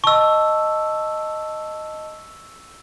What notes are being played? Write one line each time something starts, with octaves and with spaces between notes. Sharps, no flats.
D#5 A5 C#6 E6